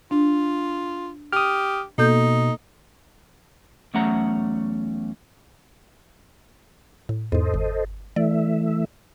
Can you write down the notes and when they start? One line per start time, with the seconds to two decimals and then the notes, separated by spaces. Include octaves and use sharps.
0.11 D4 F4
1.33 G4 D#6 F6
1.98 B2 A#3 D#4 A4 G6
3.94 E2 F#3 A3 C#4 F#5 A#5
7.09 A2
7.32 E2 G#2 A4 C5 D#5
7.54 G1
8.16 E3 A3 D5 E5